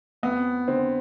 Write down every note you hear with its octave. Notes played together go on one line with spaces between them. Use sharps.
F2 B3
D3 C4